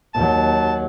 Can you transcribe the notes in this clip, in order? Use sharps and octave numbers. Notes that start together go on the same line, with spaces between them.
D#2 F#3 A5